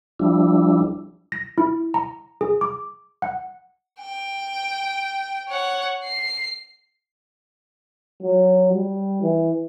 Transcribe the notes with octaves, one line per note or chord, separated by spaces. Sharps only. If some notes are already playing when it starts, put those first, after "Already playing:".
F3 G3 D4 E4
A#6
E4
A#5
G#4
D6
F#5
G5
C#5 F#5
C7
F#3
G3
E3